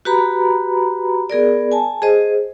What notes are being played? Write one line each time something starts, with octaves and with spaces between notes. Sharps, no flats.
F#4 G4 B4 A#5 B5
B3 G#4 A#4 D5
G#5 A5
G#4 C5 D#5